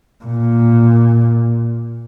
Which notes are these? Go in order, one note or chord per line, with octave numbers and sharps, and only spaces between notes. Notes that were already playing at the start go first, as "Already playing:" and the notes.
A#2